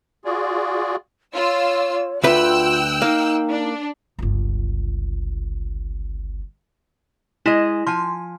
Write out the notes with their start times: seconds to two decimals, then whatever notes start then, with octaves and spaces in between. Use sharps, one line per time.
0.25 F4 F#4 G#4 D5
1.34 F4 C#5 E6
2.23 D2 F4 B4 G5 E6 F#6
3.02 A#3 D#4
3.50 D4
4.19 G1 C#2
7.46 G#3 E4 G#4 D#5 A#6
7.87 F3 G#5 C6